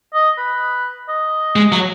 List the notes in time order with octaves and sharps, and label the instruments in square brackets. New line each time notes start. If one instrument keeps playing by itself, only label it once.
[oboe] D#5
B4
D#5
[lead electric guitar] G#3
F#3